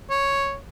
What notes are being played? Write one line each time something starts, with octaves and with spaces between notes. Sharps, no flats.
C#5